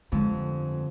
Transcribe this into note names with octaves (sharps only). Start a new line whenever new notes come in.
G1 F2 D3 G#3